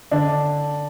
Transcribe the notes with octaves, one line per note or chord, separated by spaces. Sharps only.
D3 D4